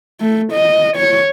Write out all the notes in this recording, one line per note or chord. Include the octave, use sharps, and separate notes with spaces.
A3
D#5
C#5